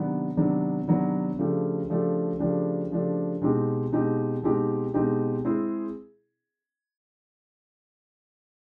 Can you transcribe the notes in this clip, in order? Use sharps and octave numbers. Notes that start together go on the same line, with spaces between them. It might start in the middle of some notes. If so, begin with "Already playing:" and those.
Already playing: C3 D#3 F#3 B3 D4
C3 D#3 F#3 B3 D4
C3 D#3 F#3 B3 D4
C#3 F3 A3 D4 G4
C#3 F3 A3 D4 G4
C#3 F3 A3 D4 G4
C#3 F3 A3 D4 G4
B2 G#3 C4 D#4 G4
B2 G#3 C4 D#4 G4
B2 G#3 C4 D#4 G4
B2 G#3 C4 D#4 G4
G#3 C4 E4 G#4